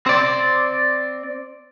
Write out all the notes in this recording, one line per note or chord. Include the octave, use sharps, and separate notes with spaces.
C4 D5